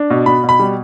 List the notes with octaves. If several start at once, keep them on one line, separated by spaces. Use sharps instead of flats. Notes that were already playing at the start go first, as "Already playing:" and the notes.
Already playing: D4
B2
B2 B5
B2
B5
G3